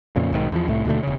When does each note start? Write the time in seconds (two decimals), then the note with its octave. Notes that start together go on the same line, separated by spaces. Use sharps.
0.16 F2 A#2 C#3
0.33 B1 G#2 D#3
0.52 E2 F3
0.68 C2 A2 A3
0.85 D#2 B2 D3 A3
1.03 E1 C#3